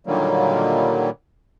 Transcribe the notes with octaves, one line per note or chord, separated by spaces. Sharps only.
A#2 D3 D#3 F#3 G3 A#3